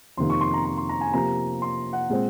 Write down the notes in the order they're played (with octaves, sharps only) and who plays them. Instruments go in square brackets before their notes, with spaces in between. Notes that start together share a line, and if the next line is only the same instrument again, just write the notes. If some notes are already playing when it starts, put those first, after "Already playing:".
[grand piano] F2 C3 D#3 A#3 C6
C#6
C6
A#5
A#5
C6
A#5
G#5
C3 F3 A#3 A#5
C6
F#5
A#2 G#3 C4